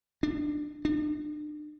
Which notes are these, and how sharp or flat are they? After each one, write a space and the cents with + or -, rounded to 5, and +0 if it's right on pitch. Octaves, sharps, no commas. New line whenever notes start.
D4 +15
D4 +40